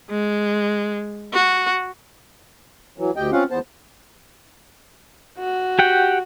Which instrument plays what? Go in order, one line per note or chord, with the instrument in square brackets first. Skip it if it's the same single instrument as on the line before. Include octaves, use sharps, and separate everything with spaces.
[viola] G#3
F#4
[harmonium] E3 F#3
D2 G4 D#5 G5
C4 C#4 F4 F5 F#5
E2 B3 C5 A5
[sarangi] F#4
[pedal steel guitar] G4 F#5 G5